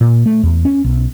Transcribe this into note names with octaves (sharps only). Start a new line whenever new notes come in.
A#2
A3
E2
C#4
B1